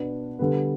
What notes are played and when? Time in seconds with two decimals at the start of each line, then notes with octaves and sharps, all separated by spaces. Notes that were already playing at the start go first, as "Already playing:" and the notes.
Already playing: B2 B3 D4
0.39 D3 G3 B3 B4